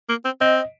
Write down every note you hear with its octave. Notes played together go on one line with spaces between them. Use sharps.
A#3
C4
C4 D#5